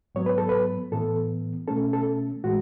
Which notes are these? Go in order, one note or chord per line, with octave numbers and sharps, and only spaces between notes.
G#2 F#3 B3 C#5
B4
A4
B4
A2 E3 B3 A4
B2 A3 C#4 A4
A4
A2 E3 G#3 F#4